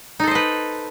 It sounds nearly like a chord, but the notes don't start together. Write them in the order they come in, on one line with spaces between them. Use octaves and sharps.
D#4 A4 C5 D#5 B4